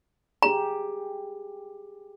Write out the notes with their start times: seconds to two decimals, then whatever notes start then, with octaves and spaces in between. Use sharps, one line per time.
0.42 G4 G#4 A#5